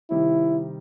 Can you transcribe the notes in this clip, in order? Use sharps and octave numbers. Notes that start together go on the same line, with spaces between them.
C3 D#3 G3 C4 E4